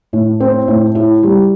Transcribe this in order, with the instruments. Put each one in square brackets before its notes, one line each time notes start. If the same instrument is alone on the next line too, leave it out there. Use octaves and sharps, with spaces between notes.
[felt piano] A2
C4
A2
E4
G3